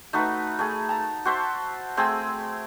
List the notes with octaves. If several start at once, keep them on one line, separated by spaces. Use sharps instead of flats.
A3 D#4 F#4 B4
A3 G#4
A5 A#5
F#4 C5 E5 A5
A3 C4 G#4 E6